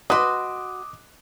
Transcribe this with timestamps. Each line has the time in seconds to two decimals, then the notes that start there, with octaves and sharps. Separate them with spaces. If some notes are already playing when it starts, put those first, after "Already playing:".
0.10 F#4 B4 D#5 C6 D6 D#6